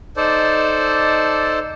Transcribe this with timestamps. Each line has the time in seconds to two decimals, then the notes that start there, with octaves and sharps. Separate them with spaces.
0.17 D#4 A4 C5 D5 A5